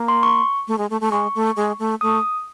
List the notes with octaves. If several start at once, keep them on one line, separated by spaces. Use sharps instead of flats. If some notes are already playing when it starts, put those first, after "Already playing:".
Already playing: A#3
C6
C#6
A3
G#3
A3
A3
G#3 C#6
A3
G#3
A3
A3 D#6